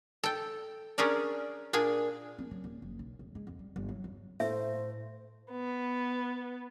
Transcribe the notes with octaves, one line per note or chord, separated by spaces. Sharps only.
A4 G5
C#4 D4 G#4 A#4 C#5 D5
A#2 D4 G#4 G#5
C4
F#3
D#1
F#1
B1
F1
G#3
F2
G3
G1
F#3
F2
A2 A3 C5 E5
B3